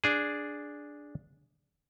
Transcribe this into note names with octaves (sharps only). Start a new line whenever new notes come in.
D4 G#4